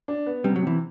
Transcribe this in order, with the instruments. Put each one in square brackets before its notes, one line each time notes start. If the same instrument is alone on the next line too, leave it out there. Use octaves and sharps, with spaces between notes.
[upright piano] D4
B3
[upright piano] C3 [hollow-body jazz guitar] G3
[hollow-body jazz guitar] F#3
[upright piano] C3 [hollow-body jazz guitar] E3